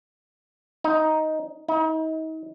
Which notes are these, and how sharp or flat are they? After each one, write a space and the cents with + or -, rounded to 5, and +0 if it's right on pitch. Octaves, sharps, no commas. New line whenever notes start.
D#4 +10
D#4 +40